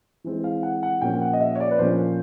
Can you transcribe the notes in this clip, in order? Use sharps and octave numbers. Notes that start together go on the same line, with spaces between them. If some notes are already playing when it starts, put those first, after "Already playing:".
E3 G#3 C4
F5
F#5
F#5
A#2 F3 A#3 C#4 G5
F#5
D#5
E5
C#5
D5
B4
A#2 F3 A#3 C#4 C5